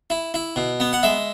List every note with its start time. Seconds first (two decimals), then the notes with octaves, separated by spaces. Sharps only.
0.10 E4
0.34 E4
0.56 B2
0.80 B3
0.93 F#5
1.03 G#3 E5